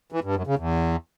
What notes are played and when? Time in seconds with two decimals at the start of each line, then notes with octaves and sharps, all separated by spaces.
0.12 E3
0.24 G2
0.35 F#2
0.47 C#3
0.58 E2